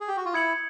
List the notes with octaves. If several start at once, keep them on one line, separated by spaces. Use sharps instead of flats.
G#4
G4
F#4
F4
E4 D#6 G#6 C#7 F#7